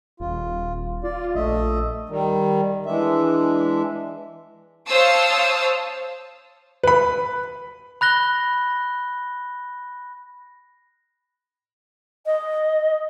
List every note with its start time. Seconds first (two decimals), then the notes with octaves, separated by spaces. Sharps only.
0.20 D#1 F4
1.04 F4 D5
1.35 A#1 A3 D#5 E5
2.07 D#3 G3
2.86 E3 G#3 D4 E5
4.87 C5 C#5 F5 A5 D#6 E6
6.83 B4 B5
8.01 B5 F#6 A#6 G7
12.25 D#5